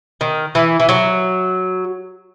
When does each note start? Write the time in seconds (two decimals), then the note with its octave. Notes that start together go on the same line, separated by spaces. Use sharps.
0.21 D#3
0.55 E3
0.80 E3
0.89 F#3